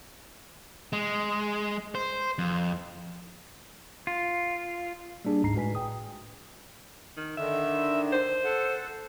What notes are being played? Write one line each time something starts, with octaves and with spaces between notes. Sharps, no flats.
G#3
C5
F2
F4
G3 A#3 D4 G#4
G#1 D2 G#2 D#4 A#5 C7
A2 G#3 F#4 B4 G#5 B6
G1 G5 D#6
D#3
D3 D#3 E5
C5
A4 F#5